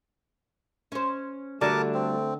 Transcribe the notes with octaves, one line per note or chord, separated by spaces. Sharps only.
C#4 C5
D3 G3 A3 D4 F#4 A#4 A5 D6
C4